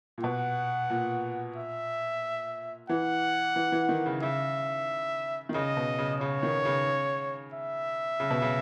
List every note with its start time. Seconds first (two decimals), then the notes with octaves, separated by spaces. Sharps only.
0.18 A#2
0.23 B2 F#5
0.90 A#2
1.56 E5
2.89 E3 F#5
3.56 E3
3.72 E3
3.89 D#3
4.06 C#3
4.23 C#3 E5
5.49 D#3
5.54 C#3 D#5
5.77 B2
5.99 C#3
6.20 C#3 C#5
6.43 D#3
6.65 C#3
7.54 E5
8.20 C#3
8.30 B2
8.42 C#3